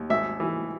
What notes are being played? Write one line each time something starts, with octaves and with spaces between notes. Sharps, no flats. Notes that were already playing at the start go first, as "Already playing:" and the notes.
Already playing: D#2
G#1 E5
E3